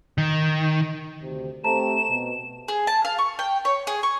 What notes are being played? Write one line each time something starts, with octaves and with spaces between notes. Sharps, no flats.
D#3
D2 C3
A3 C4 G4 C5 A5 A#5 E7
B2
G#4
A5
F5
C#6
G5
C#5
G#4
C#6